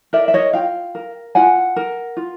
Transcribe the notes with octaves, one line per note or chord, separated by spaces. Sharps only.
A#4 D5 E5
E5
C#5 D#5
F4 F5 G5
A#4
F4 F#5 G#5
A#4
F4